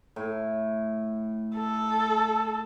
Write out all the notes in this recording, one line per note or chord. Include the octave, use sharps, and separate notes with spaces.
A2
A4